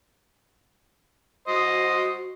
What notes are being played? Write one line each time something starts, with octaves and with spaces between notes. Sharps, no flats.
F#4 C5 D#5